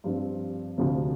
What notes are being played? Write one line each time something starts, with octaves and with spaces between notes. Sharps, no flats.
G2 F3 C4
D2 C3 F3